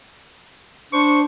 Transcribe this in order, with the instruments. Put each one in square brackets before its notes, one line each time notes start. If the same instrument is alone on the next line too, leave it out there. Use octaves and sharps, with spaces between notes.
[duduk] D4 [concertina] C5 [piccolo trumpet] C#6